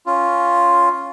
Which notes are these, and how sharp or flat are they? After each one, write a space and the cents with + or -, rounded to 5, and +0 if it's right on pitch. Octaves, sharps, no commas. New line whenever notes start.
C#4 +0 F4 +0